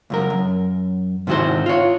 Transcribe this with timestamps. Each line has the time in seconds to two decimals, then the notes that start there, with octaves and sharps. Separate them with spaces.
0.10 C#2 F#2 A#4
0.30 F#2
1.27 G#2 C3 D#3 E4 F#4 C5
1.66 F4 C#5